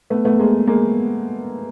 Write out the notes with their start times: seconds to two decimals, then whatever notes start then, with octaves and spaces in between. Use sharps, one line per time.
0.10 A3 B3
0.25 A3 B3
0.39 G#3 A#3
0.67 G#3 A#3